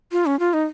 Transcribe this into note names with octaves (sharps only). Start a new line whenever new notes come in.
F4
C#4
F4
D#4